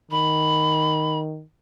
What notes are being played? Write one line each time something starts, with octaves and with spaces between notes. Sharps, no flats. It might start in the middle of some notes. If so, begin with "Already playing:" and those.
D#3 B5